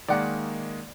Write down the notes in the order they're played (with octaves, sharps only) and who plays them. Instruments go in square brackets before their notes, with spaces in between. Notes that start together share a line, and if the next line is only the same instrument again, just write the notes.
[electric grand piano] D#3 G#3 A#3 [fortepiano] D5 F#5